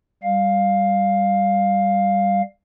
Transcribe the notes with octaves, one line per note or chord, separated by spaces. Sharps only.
G3 F5